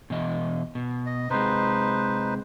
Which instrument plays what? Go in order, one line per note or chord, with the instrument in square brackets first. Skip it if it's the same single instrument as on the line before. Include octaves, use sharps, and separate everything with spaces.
[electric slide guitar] B2 E3 D#5
B2
[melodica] D#5
[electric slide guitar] C3 G#3 [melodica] D#4 B4 C5